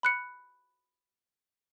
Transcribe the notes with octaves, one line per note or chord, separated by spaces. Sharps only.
B5 F#6 C#7